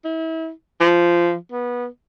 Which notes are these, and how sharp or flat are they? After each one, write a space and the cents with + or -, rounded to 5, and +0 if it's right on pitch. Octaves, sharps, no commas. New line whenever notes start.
E4 -35
F3 -15
B3 -20